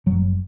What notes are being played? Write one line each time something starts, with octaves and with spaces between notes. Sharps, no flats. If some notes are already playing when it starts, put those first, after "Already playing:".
F#1 F#3